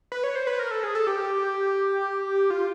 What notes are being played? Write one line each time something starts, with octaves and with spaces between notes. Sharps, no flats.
B4
C#5
C5
B4
A#4
A4
G#4
A4
G4
F4